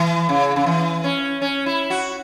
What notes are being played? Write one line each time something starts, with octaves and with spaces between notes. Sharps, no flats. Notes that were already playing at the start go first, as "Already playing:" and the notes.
Already playing: E3
C#3
C#3
E3
C#4
C#4
E4
F#4